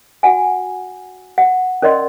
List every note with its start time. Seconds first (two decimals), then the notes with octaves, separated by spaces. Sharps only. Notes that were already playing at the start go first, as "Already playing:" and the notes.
0.23 F#4 F#5 G#5
1.38 F#5
1.82 C#4 A#4 D5 D#5 C6